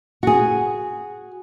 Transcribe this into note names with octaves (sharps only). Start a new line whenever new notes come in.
F#4 G#4